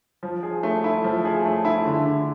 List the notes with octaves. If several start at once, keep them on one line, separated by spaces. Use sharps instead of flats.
F3
G#4
A3
E4
F3
G#4
A3
E4
D3
D3